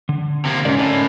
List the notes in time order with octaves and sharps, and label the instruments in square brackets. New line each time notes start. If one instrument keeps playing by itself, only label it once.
[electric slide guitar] D3
[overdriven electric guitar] C3 A#3
[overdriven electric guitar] G#2 [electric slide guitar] C3 A#4 D5 [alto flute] C#4
[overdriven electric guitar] A2 [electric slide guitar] A#4 D5